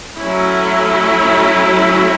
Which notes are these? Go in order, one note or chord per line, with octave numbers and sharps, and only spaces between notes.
F#3 A3 C#4 E4